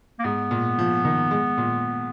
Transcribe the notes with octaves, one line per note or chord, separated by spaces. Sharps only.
A#3
G#2 B3
A#2
F3
D#3
G#3
A#2